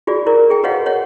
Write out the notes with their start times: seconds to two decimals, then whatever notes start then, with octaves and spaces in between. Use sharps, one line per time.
0.07 F4 F#4 G#4 D5
0.26 E4 A#4 D5
0.50 G#4 G5
0.64 F#4 B4 C#5 D#5 F5 F#5
0.86 C#5 D#5 F#5